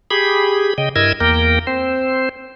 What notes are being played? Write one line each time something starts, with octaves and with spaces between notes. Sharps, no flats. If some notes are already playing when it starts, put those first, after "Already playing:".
G4 G#4 B5
C#3 D#5 G5
G2 E4 A#4 D#5 E6 G#6
E2 A#3 A#4 G5
C4 C5